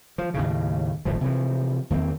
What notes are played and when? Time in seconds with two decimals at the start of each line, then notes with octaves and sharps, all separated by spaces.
0.18 F3
0.34 D#2 A2 C#3
1.05 D1 G#1 B2 F3
1.21 C3 E3 F3
1.90 E2 D#3 A#3 C4